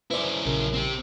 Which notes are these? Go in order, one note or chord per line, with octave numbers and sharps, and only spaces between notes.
F#2 E4 B4 C5 D5
A#1 C#3 A#4
C4 G4